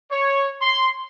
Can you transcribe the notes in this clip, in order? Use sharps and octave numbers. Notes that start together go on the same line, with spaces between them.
C#5
C6